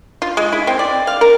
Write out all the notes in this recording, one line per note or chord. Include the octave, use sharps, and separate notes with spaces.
F4
G#3
E4
C4
D5
F5
A#4